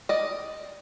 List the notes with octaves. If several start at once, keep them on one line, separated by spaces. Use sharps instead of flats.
D5 D#5